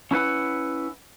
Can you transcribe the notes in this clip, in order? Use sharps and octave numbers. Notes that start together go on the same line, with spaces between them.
C#4 E4 B4 F#5